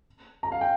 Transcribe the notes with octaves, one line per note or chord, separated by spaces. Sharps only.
A#5
F5
G5